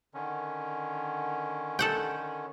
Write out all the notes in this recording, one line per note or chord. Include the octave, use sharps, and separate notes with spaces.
D3 D#3 C#4
A4 F#5 G5